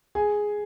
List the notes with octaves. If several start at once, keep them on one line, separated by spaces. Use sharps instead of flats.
G#4 G#5